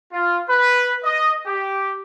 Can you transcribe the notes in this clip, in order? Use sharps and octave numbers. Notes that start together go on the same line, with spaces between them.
F4
B4
D#5
G4